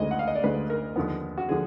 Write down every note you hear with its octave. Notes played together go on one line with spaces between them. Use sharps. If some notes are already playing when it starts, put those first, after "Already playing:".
Already playing: D2 D3 G#3 D#5
F#5
F5
D#5
D5
D2 D3 G#3 B4
A#4
D#2 D3 F3 B3
F#4
D3 F3 B3 G#4